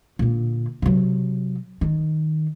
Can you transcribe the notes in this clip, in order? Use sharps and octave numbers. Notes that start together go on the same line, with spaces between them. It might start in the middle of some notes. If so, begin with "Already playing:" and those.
A#2 D3
C3 F#3
D#3